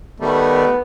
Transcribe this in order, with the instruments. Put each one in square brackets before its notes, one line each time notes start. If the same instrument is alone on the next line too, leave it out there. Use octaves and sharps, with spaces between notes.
[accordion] D#3 G3 A3 [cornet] B3